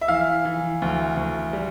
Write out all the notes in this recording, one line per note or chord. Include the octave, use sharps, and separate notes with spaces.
E5
E3 F5
E3
D2
D2
G3